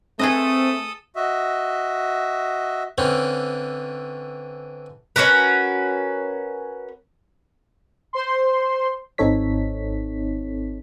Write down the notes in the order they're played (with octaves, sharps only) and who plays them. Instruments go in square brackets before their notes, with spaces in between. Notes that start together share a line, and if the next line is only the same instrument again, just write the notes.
[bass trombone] A3 [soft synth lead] C4 [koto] G#4 B4 D#5 [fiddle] A4 D#6
[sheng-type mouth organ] F#4 D#5 E5
[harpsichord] D3 E3 C4 C#4
[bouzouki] C#4 F#4 A#4 B4
[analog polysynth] C5 C6
[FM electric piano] G#1 C4 D#4 A4 C#5 B6